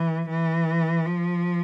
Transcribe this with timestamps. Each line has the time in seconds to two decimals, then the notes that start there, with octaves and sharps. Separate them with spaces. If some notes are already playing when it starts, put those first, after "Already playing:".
Already playing: E3
0.30 E3
1.06 F3